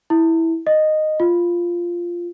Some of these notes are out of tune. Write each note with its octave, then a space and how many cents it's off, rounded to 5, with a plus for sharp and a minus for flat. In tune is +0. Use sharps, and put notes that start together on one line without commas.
E4 -10
D#5 -10
F4 -5